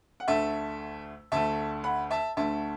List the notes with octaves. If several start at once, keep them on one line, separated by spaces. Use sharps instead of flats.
F#5
D2 D3 A3 E5 A5
D2 D3 A3 E5 A5
F#5 B5
E5 A5
D2 D3 A3 E5 A5